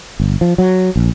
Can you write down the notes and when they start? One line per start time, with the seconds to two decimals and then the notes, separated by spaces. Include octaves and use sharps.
0.20 G1
0.41 F3
0.58 F#3
0.96 A#1